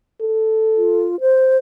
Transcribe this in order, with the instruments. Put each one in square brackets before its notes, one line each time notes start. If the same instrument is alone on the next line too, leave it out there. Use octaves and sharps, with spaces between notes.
[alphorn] A4
[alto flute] F4
C5